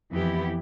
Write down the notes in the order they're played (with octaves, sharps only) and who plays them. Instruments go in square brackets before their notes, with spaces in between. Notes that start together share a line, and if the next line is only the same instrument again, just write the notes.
[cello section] F2 E3 B3 E4 G4